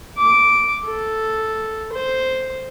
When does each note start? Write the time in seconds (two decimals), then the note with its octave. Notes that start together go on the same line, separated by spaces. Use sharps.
0.18 D6
0.85 A4
1.93 C5